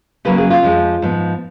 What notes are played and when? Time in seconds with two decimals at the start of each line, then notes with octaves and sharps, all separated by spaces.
0.25 C#3 F#3 A#3 C#4 B4
0.38 G#4
0.50 F4
0.63 F2 F3 G#3
1.02 G#2 F3 B3